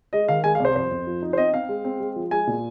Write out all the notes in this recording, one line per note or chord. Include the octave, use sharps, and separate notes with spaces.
G#3 D#5
D#3 F5
G#3 G#5
F5
C2 C5
F2 C5
F2
F3
D#4
C5
C4 D#5
C4 F5
G#3
C4
G#3
F3
G#3 G#5
A#2